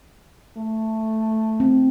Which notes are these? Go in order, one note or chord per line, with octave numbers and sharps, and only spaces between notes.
A3
C4